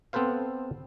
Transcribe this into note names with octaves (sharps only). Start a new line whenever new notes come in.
B3 C4 A4 B4 C5 F5